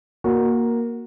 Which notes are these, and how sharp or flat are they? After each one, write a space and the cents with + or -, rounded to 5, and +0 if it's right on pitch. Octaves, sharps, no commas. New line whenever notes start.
A#3 +10 F#4 -10 A#4 +0